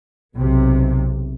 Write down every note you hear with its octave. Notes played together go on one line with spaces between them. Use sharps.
B1 C3